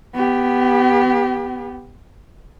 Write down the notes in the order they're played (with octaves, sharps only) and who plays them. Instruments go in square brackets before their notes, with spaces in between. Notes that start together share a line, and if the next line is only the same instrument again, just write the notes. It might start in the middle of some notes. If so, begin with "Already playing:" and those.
[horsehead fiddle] B3 G4